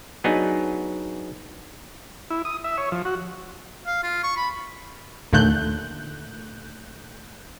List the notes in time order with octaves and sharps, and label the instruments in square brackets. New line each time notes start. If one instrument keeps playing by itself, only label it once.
[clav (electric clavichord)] F#3 B3 D4 D#4 G#4
[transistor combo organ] E4
D#6
E5
C#5
F3
F#4
[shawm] F5
F4
C#6
B5
[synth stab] D#2 A#2 D3 A3 F#6 G6